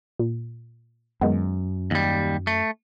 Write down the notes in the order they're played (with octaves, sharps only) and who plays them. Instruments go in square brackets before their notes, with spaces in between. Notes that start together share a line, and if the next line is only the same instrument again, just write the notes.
[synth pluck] A#2
[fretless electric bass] F#2 [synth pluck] D#3 G#3 B3
[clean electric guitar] D#2 G3
A3